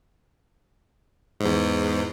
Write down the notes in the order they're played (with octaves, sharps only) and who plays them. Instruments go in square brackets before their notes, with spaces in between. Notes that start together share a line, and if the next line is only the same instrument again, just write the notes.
[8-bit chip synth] E2 G#2